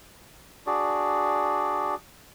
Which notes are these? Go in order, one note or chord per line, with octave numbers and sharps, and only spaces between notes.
D4 F#4 G#4 D5